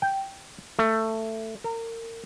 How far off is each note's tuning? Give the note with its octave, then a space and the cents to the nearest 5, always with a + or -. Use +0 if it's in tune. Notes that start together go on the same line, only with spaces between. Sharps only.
G5 -5
A3 +15
A#4 -30